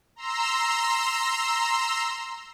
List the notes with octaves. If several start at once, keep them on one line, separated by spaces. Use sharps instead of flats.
A#5 C6 E6